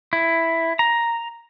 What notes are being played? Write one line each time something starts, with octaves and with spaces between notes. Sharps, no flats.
E4
A#5